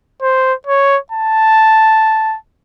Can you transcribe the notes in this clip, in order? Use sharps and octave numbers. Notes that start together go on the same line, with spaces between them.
C5
C#5
A5